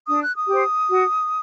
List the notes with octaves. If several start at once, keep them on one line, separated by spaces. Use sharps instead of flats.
D4 D#6
F#6
D#6
G4 C5
F#4